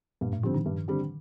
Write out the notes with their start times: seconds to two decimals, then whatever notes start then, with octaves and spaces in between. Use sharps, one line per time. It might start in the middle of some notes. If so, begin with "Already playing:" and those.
0.21 G2 A#2
0.33 A2
0.43 D3 F3 G3 C4
0.54 D#3
0.66 G2
0.88 D3 G3 C4